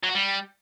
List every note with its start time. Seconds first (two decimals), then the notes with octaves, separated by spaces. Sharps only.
0.04 F#3
0.09 F#4
0.15 G3